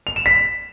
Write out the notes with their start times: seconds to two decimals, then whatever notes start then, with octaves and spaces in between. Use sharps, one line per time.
0.07 F7
0.16 E7
0.26 B6